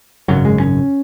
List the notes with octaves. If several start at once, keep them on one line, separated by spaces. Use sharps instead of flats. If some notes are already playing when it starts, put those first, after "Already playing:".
G#1 F#2 C#3 F#3
G#3
C#4